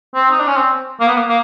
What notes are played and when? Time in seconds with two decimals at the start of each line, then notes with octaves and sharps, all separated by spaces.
0.14 C4
0.31 D#4
0.39 D4
0.47 C#4
0.56 C4
1.00 A#3
1.08 B3
1.17 A#3
1.28 A#3